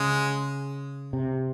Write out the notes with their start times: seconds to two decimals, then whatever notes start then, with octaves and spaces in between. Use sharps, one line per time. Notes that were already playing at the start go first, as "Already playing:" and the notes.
Already playing: C#3 G#3
1.13 C3